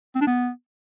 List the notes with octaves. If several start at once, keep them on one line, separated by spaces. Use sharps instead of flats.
C4
D4
B3